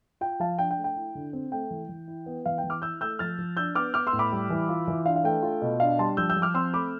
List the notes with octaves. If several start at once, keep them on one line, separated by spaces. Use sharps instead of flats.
F4 G5
F3 F5 A5
D4 G5
G5
A3
G5
E4
D3
C4
A3 G5
E3
E3
E4
B3
E3 F5
G5
E3
D6 F6
E4 E6 G6
A3 E6 G6
F3 F6 A6
F3
D4 E6 G6
B3 D6 F6
B3 D6 F6
C6 E6
A2
B5 D6
G3
E3
F4
E3
D4 F5
F5
A3 G5
F4
B2
D4 F5
G3 A5 C6
F3 E6 G6
E6 G6
F3
D6 F6
C4 C6 E6
A3 B5 D6